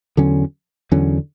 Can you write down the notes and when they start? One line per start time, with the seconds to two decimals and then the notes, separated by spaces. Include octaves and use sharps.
0.17 E2 D3 F#3 C#4
0.92 E2 D3 F#3 C#4